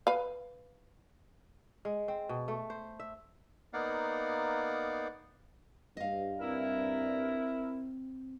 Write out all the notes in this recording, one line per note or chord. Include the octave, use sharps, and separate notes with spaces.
B4 F5
G#3
C4
B2
A3
C5
E5
A#3 B3 D#4 D5 F5 F#5
G2 D#5 F5
C4 E4 A#4